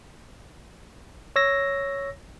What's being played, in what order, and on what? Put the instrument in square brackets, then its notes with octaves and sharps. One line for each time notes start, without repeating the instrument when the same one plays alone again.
[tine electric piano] C#5 E6 A#6